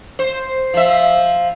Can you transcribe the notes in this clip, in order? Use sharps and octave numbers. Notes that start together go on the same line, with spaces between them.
C5
F3 E5